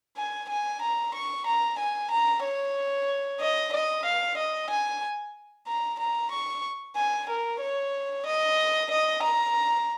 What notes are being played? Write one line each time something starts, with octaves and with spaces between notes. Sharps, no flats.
G#5
G#5
A#5
C#6
A#5
G#5
A#5
C#5
D#5
D#5
F5
D#5
G#5
A#5
A#5
C#6
G#5
A#4
C#5
D#5
D#5
A#5